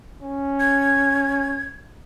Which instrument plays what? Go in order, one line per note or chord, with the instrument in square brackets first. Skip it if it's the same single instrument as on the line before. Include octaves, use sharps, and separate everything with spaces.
[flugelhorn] C#4
[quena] G#6